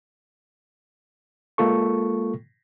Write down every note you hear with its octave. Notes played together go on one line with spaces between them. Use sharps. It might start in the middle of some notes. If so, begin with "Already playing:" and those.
G#3 A#3 F4 A4 C#6